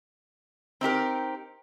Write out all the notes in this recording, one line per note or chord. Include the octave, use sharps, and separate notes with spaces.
C4 D#4 G4 A#4